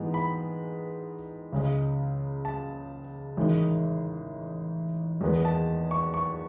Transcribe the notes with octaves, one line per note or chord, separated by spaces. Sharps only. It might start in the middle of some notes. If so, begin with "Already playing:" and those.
Already playing: G#2 E3 G#3 B3
B5
C#2 C#3 G#3
A5
A1 G#2 D#3 G#3
E2 D#3 G#3 B3 D#4
A5
C#6
C#6